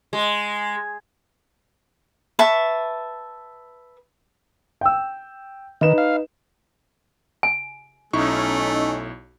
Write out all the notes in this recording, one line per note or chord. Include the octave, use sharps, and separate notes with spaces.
G#3
B4 E5 A5 C#6
G5 E6
D#3 D#4 B4 E7
F5
G#5
B1 A3 C#4 D#4 E4 C#6